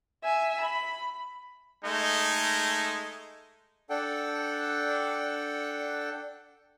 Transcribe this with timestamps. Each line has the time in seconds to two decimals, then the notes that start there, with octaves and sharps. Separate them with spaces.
0.23 E5 G#5
0.61 B5
1.85 G#3 A3 D#4
3.90 D4 A4 F#5 G5